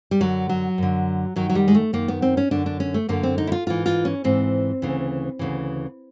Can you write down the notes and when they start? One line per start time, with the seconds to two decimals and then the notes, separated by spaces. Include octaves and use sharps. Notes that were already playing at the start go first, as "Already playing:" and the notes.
0.11 G3
0.20 F#2 D3 F#3
0.49 F#3
0.78 F#2 D3
1.36 F#2 D#3 F#3
1.50 F#3
1.55 G3
1.68 G#3
1.75 A3
1.93 F#2 D#3 A#3
2.08 B3
2.22 C4
2.37 C#4
2.51 F#2 D3 D4
2.66 D4
2.80 C#4
2.94 A3
3.09 F#2 D3 A#3
3.23 C4
3.38 D#4
3.47 E4
3.52 F4
3.66 G#2 E3 F4
3.86 F4
4.05 C#4
4.24 G#2 E3 C4
4.82 D2 C#3 E3
5.39 D2 C#3 E3